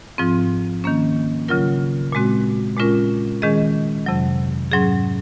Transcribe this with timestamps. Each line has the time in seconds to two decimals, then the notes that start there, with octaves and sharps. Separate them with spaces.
0.18 G#2 F3 C4 F4
0.84 D#3 A#3 C#4
1.48 C#3 F#3 C#4 F4 A#4
2.12 A#2 G#3 C4 F#4
2.77 A#2 G#3 C#4 F4 A#4
3.42 D#3 G#3 C#4 G#4 D#5
4.06 F2 C3 F#3
4.72 G#2 F#3 C#4 G#4